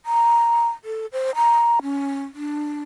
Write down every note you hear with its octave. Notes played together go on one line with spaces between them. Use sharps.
A#5
A4
C5
A#5
C#4
D4